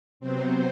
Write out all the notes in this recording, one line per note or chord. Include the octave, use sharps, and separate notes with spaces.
C3 F#3 B3 C4 C5